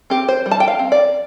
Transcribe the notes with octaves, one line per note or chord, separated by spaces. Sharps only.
C4 G4
C5
G3
A5
G5
F5
C4
D5